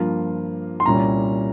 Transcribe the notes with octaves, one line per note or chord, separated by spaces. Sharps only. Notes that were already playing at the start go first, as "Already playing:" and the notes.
Already playing: G2 F3 A#3 F4
C6
C2 A#2 G3 C#4 A#5